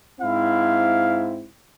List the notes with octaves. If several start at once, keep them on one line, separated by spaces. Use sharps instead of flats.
G#2 C4 E4 F5